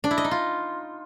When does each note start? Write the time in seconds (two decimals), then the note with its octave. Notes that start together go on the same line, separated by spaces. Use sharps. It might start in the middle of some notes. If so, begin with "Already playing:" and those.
0.04 D4
0.11 E4
0.18 D#5
0.24 D#4
0.31 F4